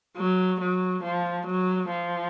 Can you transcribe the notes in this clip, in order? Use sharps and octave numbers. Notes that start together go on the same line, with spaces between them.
F#3
F#3
F3
F#3
F3